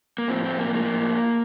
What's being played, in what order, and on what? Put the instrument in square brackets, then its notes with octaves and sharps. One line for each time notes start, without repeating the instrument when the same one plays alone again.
[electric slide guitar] A#3
A2 F3 C4
C4
A#3
A2 F3 A#3